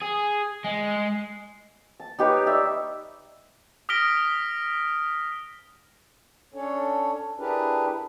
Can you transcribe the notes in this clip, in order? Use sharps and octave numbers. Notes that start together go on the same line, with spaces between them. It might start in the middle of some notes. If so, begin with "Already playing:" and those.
G#4
G#3
A5
D#4 G4 B4 C#5
D5 E5
D#6 F6 A#6 B6 D7 G7
C#4 D4 A4 C#5
D4 E4 G4 G#4 A#4 B4